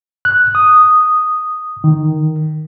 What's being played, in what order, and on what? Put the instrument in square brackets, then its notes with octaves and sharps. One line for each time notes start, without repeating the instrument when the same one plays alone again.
[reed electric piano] F#6
D#6
D#3